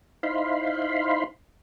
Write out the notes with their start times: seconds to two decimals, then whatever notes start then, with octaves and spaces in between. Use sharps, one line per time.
0.23 D#4 E4 C5 F5 B5 C6